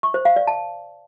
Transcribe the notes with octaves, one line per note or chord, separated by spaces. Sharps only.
C#6
C5
F5
D5
A5